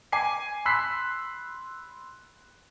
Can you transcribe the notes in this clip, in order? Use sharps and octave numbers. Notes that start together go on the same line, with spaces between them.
G#5 D6 C7
B5 C6 E6 F#6 B6 C7